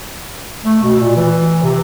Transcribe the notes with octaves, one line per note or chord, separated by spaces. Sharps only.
A3
B2
A#2
E3
C3